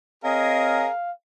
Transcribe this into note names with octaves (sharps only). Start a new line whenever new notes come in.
C4 G#4 A#4 C#5 D#5 F5